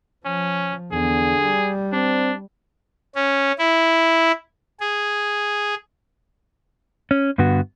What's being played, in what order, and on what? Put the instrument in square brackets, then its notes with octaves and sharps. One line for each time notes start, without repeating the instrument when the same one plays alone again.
[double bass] F3 [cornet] C#4
[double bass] E2 [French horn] D3 [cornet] G#4
[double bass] G3
[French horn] C4 [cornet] D4
[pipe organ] C#4
E4
G#4
[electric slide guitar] C#4
G2 D3 B3 F#4